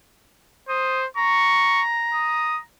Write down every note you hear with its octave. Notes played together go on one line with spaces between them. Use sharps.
C5 D#6
A#5 C#6
D#6